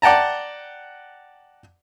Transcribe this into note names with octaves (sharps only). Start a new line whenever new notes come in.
D5 F#5 G5 A5 A#5